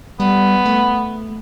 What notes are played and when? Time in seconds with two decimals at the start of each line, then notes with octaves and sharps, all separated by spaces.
0.20 G3 B3
0.66 A3